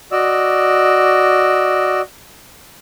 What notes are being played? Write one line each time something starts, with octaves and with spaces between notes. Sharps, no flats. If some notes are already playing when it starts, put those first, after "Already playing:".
F#4 D5 D#5 E6